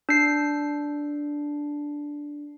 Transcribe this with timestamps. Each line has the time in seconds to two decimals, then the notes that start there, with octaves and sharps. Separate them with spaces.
0.09 D4 C7